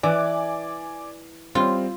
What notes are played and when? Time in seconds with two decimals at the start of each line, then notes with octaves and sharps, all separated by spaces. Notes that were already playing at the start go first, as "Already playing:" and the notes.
0.03 E3 D5 G#5 D6
1.55 G3 C4 F4